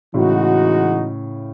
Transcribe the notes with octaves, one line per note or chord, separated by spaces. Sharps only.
A2 C#3 E3 G#3 D#4 F#4